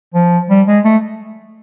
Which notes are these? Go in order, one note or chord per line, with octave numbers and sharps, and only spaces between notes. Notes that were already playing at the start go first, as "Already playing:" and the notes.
F3
G3
G#3
A3